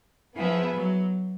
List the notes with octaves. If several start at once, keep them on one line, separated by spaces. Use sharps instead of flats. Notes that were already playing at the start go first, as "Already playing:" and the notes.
F3 B3 E4 G#4 B4 E5
F#3